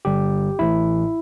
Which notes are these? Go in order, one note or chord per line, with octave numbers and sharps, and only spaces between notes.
G1 G2 D3 G3 G4
A1 A2 E3 E4